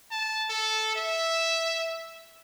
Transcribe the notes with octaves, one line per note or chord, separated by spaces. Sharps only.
A5
A4
E5